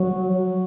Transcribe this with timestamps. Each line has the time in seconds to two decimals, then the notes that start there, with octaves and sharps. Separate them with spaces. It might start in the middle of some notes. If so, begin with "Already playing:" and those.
Already playing: F#3
0.33 F#3